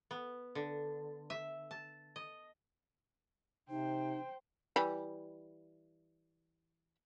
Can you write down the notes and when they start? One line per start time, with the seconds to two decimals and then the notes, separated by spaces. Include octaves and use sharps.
0.11 B3
0.55 D3
1.30 E5
1.71 A5
2.16 D#5
3.70 C3 D#4 C5 G5
4.76 E3 G3 B5